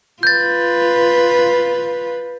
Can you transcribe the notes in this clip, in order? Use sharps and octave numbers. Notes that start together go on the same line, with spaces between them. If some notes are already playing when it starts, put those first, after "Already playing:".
F4 B4 G6 A6